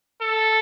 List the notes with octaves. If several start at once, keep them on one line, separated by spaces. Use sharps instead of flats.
A4